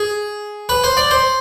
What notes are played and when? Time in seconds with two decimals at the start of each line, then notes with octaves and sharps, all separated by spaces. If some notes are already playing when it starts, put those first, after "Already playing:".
Already playing: G#4
0.69 B4
0.84 C5
0.97 D5
1.11 C5